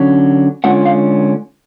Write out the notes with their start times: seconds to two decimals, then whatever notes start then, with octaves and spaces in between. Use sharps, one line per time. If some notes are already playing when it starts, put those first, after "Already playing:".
Already playing: D3 F#3 C#4
0.64 D3 G#3 C#4 F4 F#5
0.85 F5